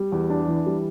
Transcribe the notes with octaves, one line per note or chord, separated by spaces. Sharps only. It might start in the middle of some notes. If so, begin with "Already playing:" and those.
Already playing: G3
E2
D4
E3
G3